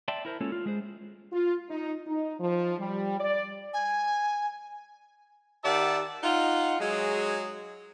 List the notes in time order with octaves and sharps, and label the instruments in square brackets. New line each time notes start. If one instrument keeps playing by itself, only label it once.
[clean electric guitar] D5 E5 G5 A5 C6
E4 A#4 C5
G#3 A#3 C#4 F4 A4 C#5
F4
G#3 G#4 C5
[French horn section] F4
D#4
D#4
F3
G3
D5
[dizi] G#5
[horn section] D#3 G4 D5 E5 F#5 A5
D#4 F4 F#5
F#3 G#3 G#4